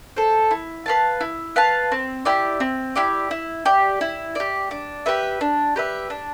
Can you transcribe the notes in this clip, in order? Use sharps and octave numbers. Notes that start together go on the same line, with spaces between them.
A4 C5
E4
B4 F5 A5
E4
B4 F5 A5
C4
E4 G4 D5
C4
E4 G4 D5
E4
G4 D5
E4
G4 D5
D4
G4 B4 E5
D4
G4 B4 E5
D4